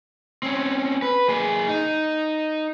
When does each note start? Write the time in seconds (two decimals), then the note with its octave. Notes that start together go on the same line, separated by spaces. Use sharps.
0.43 C4 C#4
1.02 B4
1.29 A#3 G#4
1.68 D#4